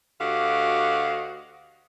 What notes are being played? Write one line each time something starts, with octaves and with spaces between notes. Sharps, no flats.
D2 D3 F#4 G4 D#5 F5